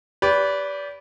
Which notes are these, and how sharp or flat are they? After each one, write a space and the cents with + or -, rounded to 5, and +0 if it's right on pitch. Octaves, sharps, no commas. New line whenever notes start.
G4 +0 B4 +0 D5 -30